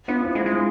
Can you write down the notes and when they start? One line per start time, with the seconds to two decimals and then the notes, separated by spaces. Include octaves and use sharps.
0.08 B3 D4 F4
0.24 C4 E4
0.35 G#3
0.40 D4 F4
0.46 G#3